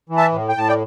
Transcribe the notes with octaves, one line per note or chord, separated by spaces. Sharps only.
E3
E5 A5
A2
G5
A2 A5
D5 G5